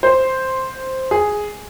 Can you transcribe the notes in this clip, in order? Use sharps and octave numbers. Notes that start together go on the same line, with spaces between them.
C5
G#4